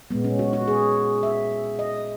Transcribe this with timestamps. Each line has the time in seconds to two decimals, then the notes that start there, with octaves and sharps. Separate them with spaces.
0.11 A#2 G#3 B3
0.24 C#4
0.39 F#4
0.53 F#4
0.68 G#4
1.23 E5
1.79 D#5